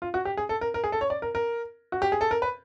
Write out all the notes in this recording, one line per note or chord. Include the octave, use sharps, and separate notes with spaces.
F4
F#4
G4
G#4
A4
A#4
A#4
G#4
A4
C#5
D5
A#4
A#4
F#4
G4
G#4
A4
A#4
B4